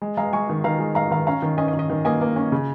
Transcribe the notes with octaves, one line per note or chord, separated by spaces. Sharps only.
G#3
G#3 F5 A#5
G#3 G#5 C#6
D#3
D#3 F5 A#5
G#3
G#3 F5 A#5
D#3 F5 A#5
C#4 F5 A#5
D#3
C#4 D#5 G#5
D#5
D#3
D#5
D#3
A#3 D#5 G#5
A#3
C#4
C#3